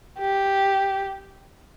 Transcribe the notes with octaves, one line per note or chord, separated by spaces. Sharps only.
G4